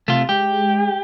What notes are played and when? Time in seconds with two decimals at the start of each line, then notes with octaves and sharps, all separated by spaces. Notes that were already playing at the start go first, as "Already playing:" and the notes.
0.08 C3 A3 F4
0.29 G#3 G4